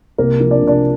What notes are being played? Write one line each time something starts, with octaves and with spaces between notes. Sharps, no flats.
C2 A#3 A#4
F3
D4 D5
C2
D4 D5